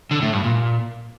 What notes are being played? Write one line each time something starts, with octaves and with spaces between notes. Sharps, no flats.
D3
A2
G2
A#2